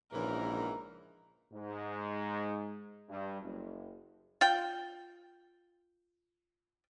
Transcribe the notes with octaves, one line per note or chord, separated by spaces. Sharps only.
A#1 G#2 C#3 E3 A#4
G#2
G2
F#1
F4 G5